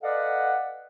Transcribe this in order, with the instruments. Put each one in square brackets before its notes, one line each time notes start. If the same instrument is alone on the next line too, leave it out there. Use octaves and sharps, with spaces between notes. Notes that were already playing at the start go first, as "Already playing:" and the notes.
[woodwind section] A4 B4 D5 D#5 F5 F#5